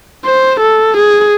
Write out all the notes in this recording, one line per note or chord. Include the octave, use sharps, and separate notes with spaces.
C5
A4
G#4